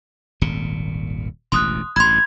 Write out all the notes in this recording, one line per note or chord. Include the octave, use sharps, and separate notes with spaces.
D#1 G#1 A#2
E1 A1 D2 C6 D#6 F#6
A1 G2 B5 C6 G#6